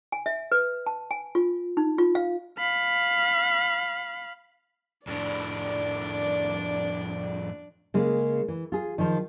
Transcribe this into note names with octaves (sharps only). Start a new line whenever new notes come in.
G#5
E5
B4
A5
G#5
F4
D#4
F4
F5
F5 B5
F2 A2 D4 D5
C#3 G#3 A#3
E3
F4 G#4
D#3 F3